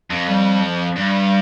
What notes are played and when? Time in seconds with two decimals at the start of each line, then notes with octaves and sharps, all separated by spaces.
0.10 F2
0.28 G3
0.62 F3
0.96 G2 G3